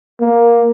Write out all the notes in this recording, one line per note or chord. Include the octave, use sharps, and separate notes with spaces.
A#3